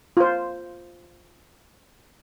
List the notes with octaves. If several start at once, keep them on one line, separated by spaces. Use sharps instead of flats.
F4 C5